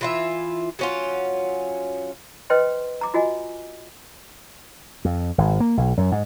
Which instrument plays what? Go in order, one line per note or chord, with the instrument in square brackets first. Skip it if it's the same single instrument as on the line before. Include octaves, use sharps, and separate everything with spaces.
[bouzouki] E3 F4 E5
F#3 C#4 F4
[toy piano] B4 C5 D#5 G5 C6
A#5 D6
F4 F#4 D#5 G#5
[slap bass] F2
G#1
A#3
B1
F#2
G#2